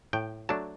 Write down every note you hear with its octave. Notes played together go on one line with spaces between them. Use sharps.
A2 G5
F#3 A3 D4 A5